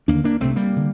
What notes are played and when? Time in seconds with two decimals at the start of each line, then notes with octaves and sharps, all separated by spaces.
0.08 D#2 D3 A#3 D4
0.24 A#3 D4
0.40 C2 C3 A3 C4
0.56 G3 A#3
0.76 D3